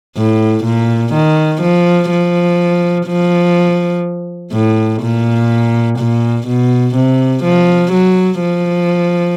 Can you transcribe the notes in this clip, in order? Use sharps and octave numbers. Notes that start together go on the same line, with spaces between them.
A2
A#2
D#3
F3
F3
F3
A2
A#2
A#2
B2
C3
F3
F#3
F3